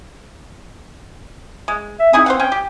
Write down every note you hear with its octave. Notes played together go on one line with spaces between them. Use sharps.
G#3
E5
C4 D#4 E4 G#4
C5 F5 F#5
C#4 G5
G4